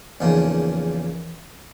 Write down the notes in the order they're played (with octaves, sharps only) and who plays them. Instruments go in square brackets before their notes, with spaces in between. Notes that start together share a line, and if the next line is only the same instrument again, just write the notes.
[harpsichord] E2 C#3 F3 A#3 D#4